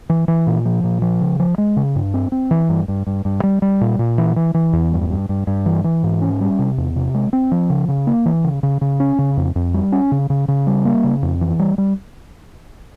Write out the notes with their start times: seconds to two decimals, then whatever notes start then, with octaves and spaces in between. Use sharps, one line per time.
0.10 E3
0.28 E3
0.47 A#2
0.65 F3
0.84 A#2
1.02 F3
1.21 C#3
1.40 F3
1.58 G#3
1.77 C#3
1.96 G2
2.14 C4
2.32 C4
2.51 E3
2.69 G2
2.88 G2
3.07 G2
3.25 G2
3.43 G3
3.62 G3
3.81 A#2
3.99 A#2
4.18 E3
4.36 E3
4.54 E3
4.73 E2
4.92 G2
5.10 G2
5.29 G2
5.47 G2
5.66 E3
5.84 E3
6.03 G#2
6.22 C#4
6.41 G3
6.59 C3
6.78 E2
6.96 C3
7.14 G#3
7.33 C4
7.52 F3
7.70 C#3
7.88 C#3
8.07 A#3
8.26 E3
8.44 C#3
8.63 C#3
8.81 C#3
9.00 C#4
9.19 C#3
9.37 F2
9.56 F2
9.74 G3
9.92 C#4
10.12 C#3
10.30 C#3
10.48 C#3
10.67 G3
10.85 A#3
11.04 C#3
11.23 F2
11.41 E3
11.59 G3
11.78 G3